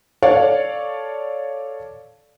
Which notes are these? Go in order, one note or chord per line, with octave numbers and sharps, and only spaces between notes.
A4 C#5 D5 F5